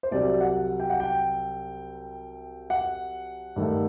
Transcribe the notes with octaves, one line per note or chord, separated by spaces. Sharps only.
C5
C2 C3 F#3 D5
F#5
G5
F#5
G5
F#5
G2 D#3 A3